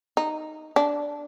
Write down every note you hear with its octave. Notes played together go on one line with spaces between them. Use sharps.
D#4
D4